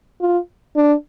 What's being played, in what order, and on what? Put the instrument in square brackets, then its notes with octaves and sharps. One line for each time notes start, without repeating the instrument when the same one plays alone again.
[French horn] F4
D4